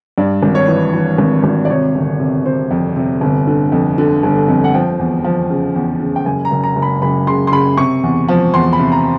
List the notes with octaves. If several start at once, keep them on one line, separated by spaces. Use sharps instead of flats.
G2 D5
G#1
C#5
E3
E3
G#1
G#1
D5
C3 C#5
G1
C3
C3 C5
F2
C3
G1
D3
F2
D3
G1
F2
F#5
F3 G5
E2
F3
C#3
E2
C#3
G5
F#1 G#5
A#5
F#1
A#5
F#1
B5
F#1 B5
C#3 C6
C6
C#3 B5
C3 C#6
E2
F3
E2 C6
B5
C3
A#5